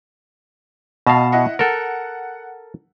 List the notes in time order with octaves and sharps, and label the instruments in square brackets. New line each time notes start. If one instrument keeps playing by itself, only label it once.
[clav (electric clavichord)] B2 F5 [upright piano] D#5 A5
[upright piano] E4 D#5 F#5
[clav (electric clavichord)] A4 A#4 [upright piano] F#5